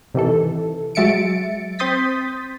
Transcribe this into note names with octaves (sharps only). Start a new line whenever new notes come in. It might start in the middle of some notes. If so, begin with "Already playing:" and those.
C3 D#3 E3 A4
F#3 G#3 E5 A6 C#7 D7
C4 C6 D#6 G6 A6 B6